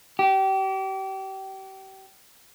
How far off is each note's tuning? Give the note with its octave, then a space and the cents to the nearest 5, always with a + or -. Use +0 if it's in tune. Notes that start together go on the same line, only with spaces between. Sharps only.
G4 -30